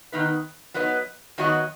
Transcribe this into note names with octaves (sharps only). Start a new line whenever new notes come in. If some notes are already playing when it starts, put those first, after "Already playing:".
D#3 B3 D#4 B4
F#3 B3 D#4 B4 D#5
D#3 F#3 B3 F#4 D#5